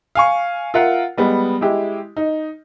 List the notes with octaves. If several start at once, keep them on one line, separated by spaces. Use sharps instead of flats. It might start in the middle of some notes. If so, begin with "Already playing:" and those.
F5 G#5 C#6
F4 A#4 E5 F#5
G3 G#3 B3
G#3 E4 G4
D#4